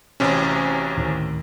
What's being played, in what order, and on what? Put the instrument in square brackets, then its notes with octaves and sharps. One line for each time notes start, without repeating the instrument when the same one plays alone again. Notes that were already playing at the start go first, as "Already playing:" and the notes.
[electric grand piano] A1 C3 C#4 [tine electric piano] F#4 B5
[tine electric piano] D2 A2 D#3